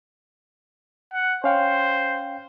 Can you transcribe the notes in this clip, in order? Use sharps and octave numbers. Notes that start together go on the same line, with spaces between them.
F#5
C#4 C5 F5 G5